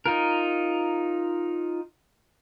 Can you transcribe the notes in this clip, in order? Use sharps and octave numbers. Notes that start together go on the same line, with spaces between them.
D#4 F4 A#4